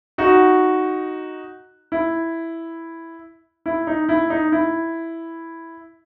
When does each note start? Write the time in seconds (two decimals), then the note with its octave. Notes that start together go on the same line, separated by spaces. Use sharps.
0.18 D#4 F#4
1.92 E4
3.66 E4
3.87 D#4
4.09 E4
4.30 D#4
4.52 E4